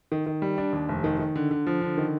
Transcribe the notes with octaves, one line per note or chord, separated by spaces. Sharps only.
D#3
D#3
G3
D4
D#2
F1
D#3
D#3
D3
D3
F3
D3
D#3